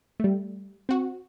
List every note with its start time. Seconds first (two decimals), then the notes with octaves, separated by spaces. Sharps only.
0.20 G3 A3
0.89 C4 F#4